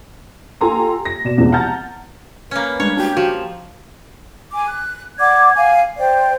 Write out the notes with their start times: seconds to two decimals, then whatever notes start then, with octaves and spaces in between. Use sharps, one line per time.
0.61 F4 G4 A4 G#5 A#5 C6
1.05 A#6
1.25 B2 D5 E7
1.37 B1 E2 C3 E3 F3 G#3
1.52 F#5 A5 A#5 F6 G6 A6
2.51 A#3 C#4 B4
2.80 G3 G#3 D4 C#5
2.97 D4 F#4 G4
3.17 F3 F#4
4.52 G#5 D6
4.67 F#6
5.19 D5 F#5 D6 G#6
5.56 F5 G#5
5.98 C5 D5 G5